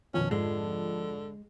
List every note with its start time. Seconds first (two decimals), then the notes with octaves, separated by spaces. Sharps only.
0.14 F2 B2 D#3 C#4
0.31 G#2 D3 G#3